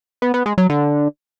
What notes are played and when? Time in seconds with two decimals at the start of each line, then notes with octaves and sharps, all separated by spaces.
0.22 B3
0.34 B3
0.46 G#3
0.58 F#3
0.70 D3